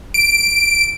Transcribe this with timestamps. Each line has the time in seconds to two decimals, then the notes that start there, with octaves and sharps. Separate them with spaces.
0.14 D7